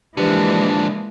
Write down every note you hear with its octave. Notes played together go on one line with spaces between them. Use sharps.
D3 E3 F3 G#3 A#3 D4 G4 B4